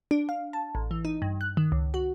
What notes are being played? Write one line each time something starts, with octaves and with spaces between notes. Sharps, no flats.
D4
F5
A5
A1
E3
D#4
G2
F#6
D#3
C#2
F#4